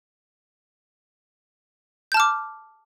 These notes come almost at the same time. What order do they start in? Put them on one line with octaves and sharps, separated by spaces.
G6 A5 F6 D6